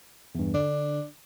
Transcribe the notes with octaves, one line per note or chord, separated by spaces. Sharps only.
E2 G2
D3 D4